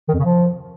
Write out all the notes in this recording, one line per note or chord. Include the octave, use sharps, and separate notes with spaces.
D#3
F2
C#3
F3